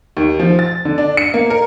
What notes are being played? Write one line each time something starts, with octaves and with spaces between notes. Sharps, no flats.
D#2
F3
A6
D3
D4
C#7
A#3
A#4